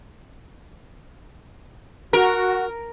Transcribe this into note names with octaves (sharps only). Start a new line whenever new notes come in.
F#4 A#4